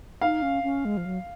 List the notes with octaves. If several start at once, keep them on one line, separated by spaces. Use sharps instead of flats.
D#4 F5
C#4
C#4
G#3
F3
F#3